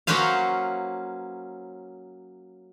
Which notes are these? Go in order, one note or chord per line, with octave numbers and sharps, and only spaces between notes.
F#3 A#3 C#4 B4 C5 F5